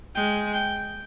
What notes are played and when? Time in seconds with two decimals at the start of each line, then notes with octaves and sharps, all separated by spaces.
0.15 G#3 G5
0.54 G5